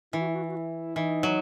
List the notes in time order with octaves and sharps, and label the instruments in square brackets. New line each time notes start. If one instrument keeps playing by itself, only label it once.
[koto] E3 [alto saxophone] E4
[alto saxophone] F#4
E4
F#4
E4
F#4
E4
[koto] E3 [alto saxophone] D#4
[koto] F#3